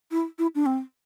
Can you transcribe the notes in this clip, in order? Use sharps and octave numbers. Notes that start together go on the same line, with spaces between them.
E4
E4
D4
C4